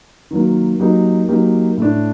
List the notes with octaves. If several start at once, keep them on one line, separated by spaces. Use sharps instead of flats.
D#3 F#3 A#3
F#3 A#3 D#4 G4
F#3 A#3 D#4 G4
A2 A3 D4